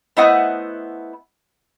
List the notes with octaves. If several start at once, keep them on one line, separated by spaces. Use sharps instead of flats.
A3 B3 E4 C5 D#5 F#5